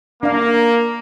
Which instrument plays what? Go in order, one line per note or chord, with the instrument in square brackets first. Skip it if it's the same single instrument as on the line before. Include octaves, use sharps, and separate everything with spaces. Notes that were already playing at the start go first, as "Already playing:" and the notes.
[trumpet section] A#3 [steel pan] D4 F5